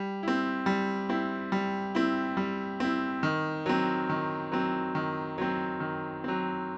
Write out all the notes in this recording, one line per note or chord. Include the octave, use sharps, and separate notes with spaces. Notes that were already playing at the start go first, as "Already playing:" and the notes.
Already playing: G3
C4 E4
G3
C4 E4
G3
C4 E4
G3
C4 E4
D#3
F#3 C4
D#3
F#3 C4
D#3
F#3 C4
D#3
F#3 C4